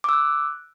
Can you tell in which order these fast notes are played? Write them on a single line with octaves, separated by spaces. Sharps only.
D6 E6 F#6